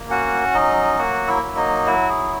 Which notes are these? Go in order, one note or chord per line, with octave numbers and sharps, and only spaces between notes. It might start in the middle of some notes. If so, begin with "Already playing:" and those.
Already playing: A#3
C#4 F#4 F#5
F#3 D#4 D#5
A#3 F#4 F#5
E4 E5
F#3
D#4 D#5
E4 F#4
G#4